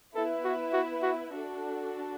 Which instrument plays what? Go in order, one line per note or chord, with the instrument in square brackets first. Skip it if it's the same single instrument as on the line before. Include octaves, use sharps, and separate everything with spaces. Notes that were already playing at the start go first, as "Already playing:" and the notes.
[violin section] B3 E4 B4 E5 [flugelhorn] A4
[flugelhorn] F#4
F#4
F#4
[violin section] D4 F#4 A4